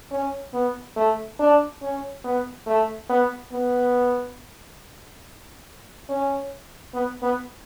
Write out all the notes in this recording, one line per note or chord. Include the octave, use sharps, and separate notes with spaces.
C#4
B3
A3
D4
C#4
B3
A3
B3
B3
C#4
B3
B3